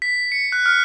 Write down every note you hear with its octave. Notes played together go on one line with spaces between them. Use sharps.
B6
C#7
F#6
F6